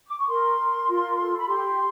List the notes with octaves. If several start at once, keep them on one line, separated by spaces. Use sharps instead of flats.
D6
C#6
A#4 C6
A#4
F4
A4
B5
G4 C6